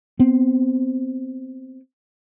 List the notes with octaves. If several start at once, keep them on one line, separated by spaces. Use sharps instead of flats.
B3 C4